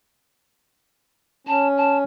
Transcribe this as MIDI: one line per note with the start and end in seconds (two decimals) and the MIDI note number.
1.47 2.04 61
1.47 1.68 81
1.77 1.97 81